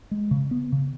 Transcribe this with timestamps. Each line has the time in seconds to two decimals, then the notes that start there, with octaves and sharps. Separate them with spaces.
0.11 G#3
0.31 C#3
0.51 B3
0.72 C#3